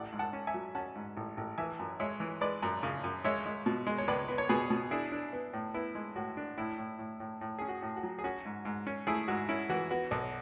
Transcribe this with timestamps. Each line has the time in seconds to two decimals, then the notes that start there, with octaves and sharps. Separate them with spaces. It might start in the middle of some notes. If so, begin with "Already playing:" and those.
Already playing: A1 D5 F#5
0.12 G#2
0.19 F#5 A5
0.33 C#4
0.47 E5 G#5
0.54 F#3
0.75 C#4 F#5 A5
0.95 G#2
1.17 A1
1.37 A1
1.58 E3 E5 G#5
1.79 F#2
2.00 G#3 C#5 E5
2.20 E3
2.41 G#3 B4 D5
2.62 F#2
2.83 C#3
3.04 F#2
3.24 G#3 C#5 E5
3.46 G#3
3.66 B2
3.87 G#3
3.98 C#5
4.08 C#2 B4 D5
4.28 B3
4.38 C#5
4.49 B2 G#4 B4
4.70 B2
4.91 D4 E4 G#4
5.12 D4
5.33 B3
5.53 A2
5.74 B3 E4
5.95 G#3
6.16 A2 F#4
6.37 D4
6.58 A2 E4
6.78 A2
6.99 A2
7.20 A2
7.41 A2
7.59 C#4 G#4
7.68 F#4
7.82 A2
7.96 F#4
8.03 F#3
8.19 G#4
8.24 C#4 F#4
8.45 G#2
8.65 G#2
8.87 C#4
9.07 A3 E4 G#4
9.28 G#2 F#4
9.49 C#4 E4
9.70 E3 F#4
9.90 B3 F#4
10.11 B1